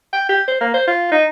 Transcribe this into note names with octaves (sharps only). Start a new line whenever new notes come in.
G5
G4
C5
A#3
C5
F4
D#4